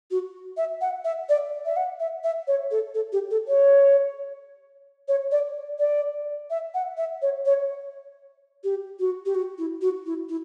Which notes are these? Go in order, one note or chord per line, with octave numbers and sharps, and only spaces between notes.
F#4
E5
F#5
E5
D5
E5
F#5
E5
E5
C#5
A4
A4
G4
A4
C#5
C#5
D5
D5
E5
F#5
E5
C#5
C#5
G4
F#4
G4
F#4
E4
F#4
E4
E4